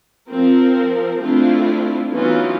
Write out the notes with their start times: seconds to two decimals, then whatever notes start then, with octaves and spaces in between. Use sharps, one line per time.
0.29 F3 C4 A#4
1.21 A3 C4 D4 E4 F4
2.11 E3 F#3 B3 C#4 D#4 F4